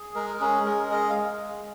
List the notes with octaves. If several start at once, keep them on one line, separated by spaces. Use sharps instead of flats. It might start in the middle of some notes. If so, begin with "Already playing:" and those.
Already playing: G#4
G#3 A#4
C#4 G#4
G#3 A#4
G#4 D#5
F5
G#3